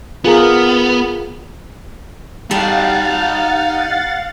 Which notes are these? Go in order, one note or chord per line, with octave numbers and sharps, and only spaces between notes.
B3 F4 G#4 A#4
G3 D#4 F5 F#5 A5 A6